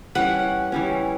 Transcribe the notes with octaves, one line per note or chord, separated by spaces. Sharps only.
E3 G3 C#4 F#5
E3 G3 C#4